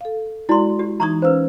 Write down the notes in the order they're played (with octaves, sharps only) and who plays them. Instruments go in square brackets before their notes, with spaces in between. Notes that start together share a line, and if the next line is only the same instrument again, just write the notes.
[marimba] A4 F5
[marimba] G#3 F#4 D5 [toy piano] E4 C6
[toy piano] G4
[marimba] E3 D#4 G#6 [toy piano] A#5 C#6 D#6
[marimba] C#4 F5 E6 [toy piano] B4 C5